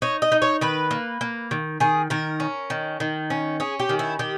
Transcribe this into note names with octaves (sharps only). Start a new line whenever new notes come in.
D#4 C#5
D#5
D#4
C#5
D#3 B4
A#3
A#3
D#3
D#3 G#4
D#3 A#4
C#4
D#3
D#3
C#4
C#4 G#4
G4
D#3
E4
D#3 G4